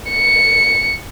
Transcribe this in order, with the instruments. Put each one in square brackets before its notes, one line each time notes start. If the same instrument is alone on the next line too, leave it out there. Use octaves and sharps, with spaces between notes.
[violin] C#7